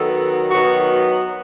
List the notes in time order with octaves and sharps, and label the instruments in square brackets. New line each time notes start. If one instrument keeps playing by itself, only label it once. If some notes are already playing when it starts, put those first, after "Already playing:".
Already playing: [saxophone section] D#3 F#3 B3 A4
D#3 F#3 B3 F#4